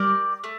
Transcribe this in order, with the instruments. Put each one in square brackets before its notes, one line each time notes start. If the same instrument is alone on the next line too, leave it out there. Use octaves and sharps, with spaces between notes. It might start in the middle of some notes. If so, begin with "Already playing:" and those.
Already playing: [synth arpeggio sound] G3 [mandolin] G4 A#4 D5
[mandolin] A3